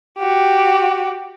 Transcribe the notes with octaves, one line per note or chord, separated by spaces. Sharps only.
F#4 G4